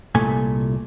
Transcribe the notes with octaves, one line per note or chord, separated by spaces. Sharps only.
C2 A#2 A3 G#5